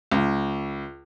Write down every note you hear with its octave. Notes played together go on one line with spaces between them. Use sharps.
C#2